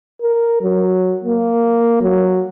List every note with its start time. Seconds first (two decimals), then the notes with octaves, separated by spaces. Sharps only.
0.22 A#4
0.62 F#3
1.24 A#3
2.02 F#3